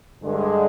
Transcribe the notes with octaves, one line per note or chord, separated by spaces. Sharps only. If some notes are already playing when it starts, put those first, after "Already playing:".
G2 D3 G#3